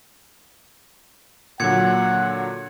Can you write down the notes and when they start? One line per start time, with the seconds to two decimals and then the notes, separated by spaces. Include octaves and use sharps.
1.60 A#2 D3 F#3 F#5 G#6 C#7